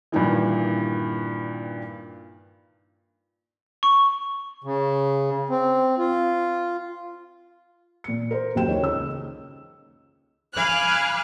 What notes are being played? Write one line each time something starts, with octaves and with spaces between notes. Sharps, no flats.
G2 A#2 D#3 E3
C#6
C#3
C4
F4
A#2 C#7
A#4 C5
F#1 D#2 F#3 G5 E7
D#4 C#5
C#2 E6
F5 G#5 B5 D6 F6 F#6